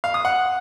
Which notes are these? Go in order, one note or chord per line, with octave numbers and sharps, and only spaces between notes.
F5
D#6
F#5